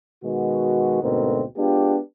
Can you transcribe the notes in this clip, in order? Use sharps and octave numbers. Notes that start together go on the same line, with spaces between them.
B2 D#3 G#3 F#4
D2 G#2 B2 A3 C4 A#4
G#3 B3 D4 F4 G4